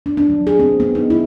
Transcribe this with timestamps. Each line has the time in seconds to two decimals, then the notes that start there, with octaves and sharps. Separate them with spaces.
0.06 D4
0.17 D4
0.30 F#3
0.47 G#4
0.59 C4
0.80 B3
0.95 D#4
1.10 E4